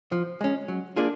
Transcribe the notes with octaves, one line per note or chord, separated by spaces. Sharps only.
F3
G#3 C#4
F#3
A#3 D4 F4 G#4